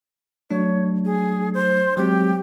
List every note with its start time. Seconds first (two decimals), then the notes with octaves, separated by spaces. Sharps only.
0.51 F#3 A3 D4 C#5
1.05 G#4
1.54 C5
1.97 F#3 G#3 C4 G4